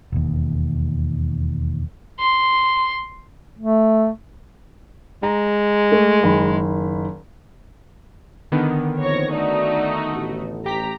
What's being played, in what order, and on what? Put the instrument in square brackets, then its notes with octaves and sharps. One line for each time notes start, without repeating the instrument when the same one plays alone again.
[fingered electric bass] E1 D#2
[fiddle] C6
[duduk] A3
[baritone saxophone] G#3 [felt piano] A#5
[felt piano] A3
F#1 D#3 B5
[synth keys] D3 D#3 B3
[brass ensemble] A#1 F2 C5 [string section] C#5 C#6 A#6
[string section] A3 D#4 F#4 [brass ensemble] D5
[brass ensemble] A1
[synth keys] G4 B6 [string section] A#5